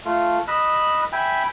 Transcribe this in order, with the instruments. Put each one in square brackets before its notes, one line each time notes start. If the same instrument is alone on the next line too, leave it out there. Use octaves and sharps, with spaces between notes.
[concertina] A3 F4
D#5 B5 E6 F#6
E5 G5 G#5 B5